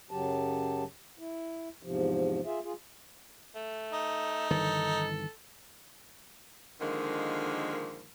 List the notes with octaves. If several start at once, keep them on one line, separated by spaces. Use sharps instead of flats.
F#2 C#3 F#3 G4 A5
E4
E2 G#2 C3 F3
F4 G#4 E5
F4 G#4
A3
D#4
G1 D#3 E3 A4
D3 D#3 F3 G#3 A#3